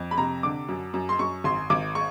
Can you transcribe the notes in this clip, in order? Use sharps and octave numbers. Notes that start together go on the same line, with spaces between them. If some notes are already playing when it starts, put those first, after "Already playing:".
Already playing: F2
B5
C3 A#5
D3 D6
F#2
F#2
C6
F#2 C#6
G#1 C6
G#1 D6
C#6